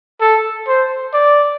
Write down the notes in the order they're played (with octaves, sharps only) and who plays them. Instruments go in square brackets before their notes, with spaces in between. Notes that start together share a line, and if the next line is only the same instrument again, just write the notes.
[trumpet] A4
C5
D5